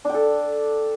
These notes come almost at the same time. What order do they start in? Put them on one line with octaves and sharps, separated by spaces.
D4 G5 A4